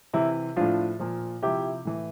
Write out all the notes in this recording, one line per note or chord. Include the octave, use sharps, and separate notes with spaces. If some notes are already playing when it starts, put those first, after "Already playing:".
C3 E3 E4
A2 F3 D4 F4
A#2 F3
C3 F3 E4 G4
A2 E3